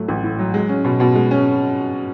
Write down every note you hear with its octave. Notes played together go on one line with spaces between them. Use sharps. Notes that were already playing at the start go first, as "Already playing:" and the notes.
Already playing: A2 F#3 A3
A1
A2
F#3
G#3
C#4
B2
B2
G#3
C#4